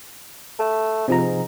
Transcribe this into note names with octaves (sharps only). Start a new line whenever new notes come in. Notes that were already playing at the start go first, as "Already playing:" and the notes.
A3
G#2 C3 F3 A#5